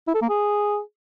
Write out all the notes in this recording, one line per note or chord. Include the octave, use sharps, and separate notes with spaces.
E4
A4
A#3
G#4